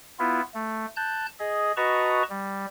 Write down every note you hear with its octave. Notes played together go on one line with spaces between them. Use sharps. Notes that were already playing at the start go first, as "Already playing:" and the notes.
B3 E4 F4
A3
A5 F#6 G6
G#4 D#5
F#4 B4 D#5 A5 A#5 C#6
G3